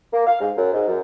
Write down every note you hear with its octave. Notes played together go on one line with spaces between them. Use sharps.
A#3
F5
G#2
F#2
G#2
F#2